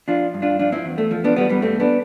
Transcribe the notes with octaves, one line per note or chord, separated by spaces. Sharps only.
F3 D4 F4
G2
D4 F4
F3 D4 F4
C4 E4
E2
A3
F3
B3 D4
E2 G3 B3
G3 B3
G2 A3 C4
B3 D4